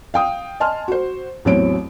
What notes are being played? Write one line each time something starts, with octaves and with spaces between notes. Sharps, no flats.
F5 G5 D#6
D#5 G#5 A5 C6 F6
F#4 C5
A1 E2 F#3 C4 C#5 D7